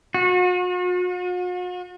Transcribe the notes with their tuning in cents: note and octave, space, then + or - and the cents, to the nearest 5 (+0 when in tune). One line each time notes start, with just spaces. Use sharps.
F#4 -45